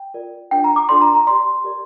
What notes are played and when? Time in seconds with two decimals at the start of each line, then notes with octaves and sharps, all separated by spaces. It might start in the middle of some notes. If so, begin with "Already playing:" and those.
Already playing: G5
0.14 F4 A#4 D5
0.51 D4 F4 A#4 D5 G5
0.64 A#5
0.76 D6
0.89 D4 F4 A4 D5 C6
1.01 A#5
1.15 A#5
1.27 G4 D5 C6
1.64 G4 A#4 D5